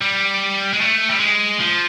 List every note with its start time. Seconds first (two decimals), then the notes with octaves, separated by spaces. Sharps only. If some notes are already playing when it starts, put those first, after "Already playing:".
0.01 G3
0.73 G#3
0.81 A3
1.10 G3
1.20 G#3
1.60 F3